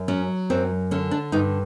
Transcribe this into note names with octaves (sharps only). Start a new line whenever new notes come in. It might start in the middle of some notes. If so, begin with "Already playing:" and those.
Already playing: F#2
F#3 C#4
F#2 C4
D3 C#4
D4
G2 D#4